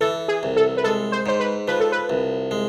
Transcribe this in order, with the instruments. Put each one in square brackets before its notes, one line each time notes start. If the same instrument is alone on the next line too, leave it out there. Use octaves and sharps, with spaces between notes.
[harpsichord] E3 [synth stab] A4
[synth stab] G#4
[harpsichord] C2
[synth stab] A4
B4
[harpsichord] G#3 [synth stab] A4
[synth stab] C5
[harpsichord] G#2 [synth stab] C5
[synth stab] B4
[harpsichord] F3 [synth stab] B4
[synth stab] A4
B4
[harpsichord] C2
G#3